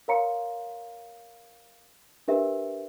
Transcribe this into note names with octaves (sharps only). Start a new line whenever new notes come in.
A#4 C#5 F5 A#5 C6 C#7
D4 G4 A#4 B4 E5